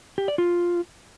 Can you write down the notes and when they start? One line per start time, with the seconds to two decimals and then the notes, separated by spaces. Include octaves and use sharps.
0.18 G4
0.28 D5
0.38 F4